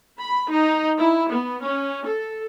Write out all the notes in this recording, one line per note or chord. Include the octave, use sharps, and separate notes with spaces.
B5
D#4
E4
B3
C#4
A4